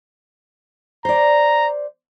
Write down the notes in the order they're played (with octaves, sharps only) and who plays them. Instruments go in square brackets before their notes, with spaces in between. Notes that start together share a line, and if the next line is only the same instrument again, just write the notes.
[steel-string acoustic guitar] C5 D5 [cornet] A#5